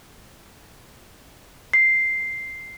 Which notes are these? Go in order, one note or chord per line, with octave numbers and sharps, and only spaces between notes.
C7